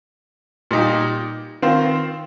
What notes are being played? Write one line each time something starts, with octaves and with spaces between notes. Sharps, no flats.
A#2 G3 D#4 G4
D#3 C4 F4 C5